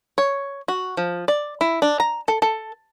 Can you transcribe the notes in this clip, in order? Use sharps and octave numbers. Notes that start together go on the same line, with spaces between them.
C#5
F#4
F3
D5
E4
D4
A#5
A4
A4